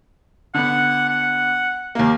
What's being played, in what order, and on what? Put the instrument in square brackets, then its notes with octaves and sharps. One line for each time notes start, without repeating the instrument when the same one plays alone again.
[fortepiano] D3 B3 [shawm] F#5
[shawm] F#5
[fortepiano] D#2 A#3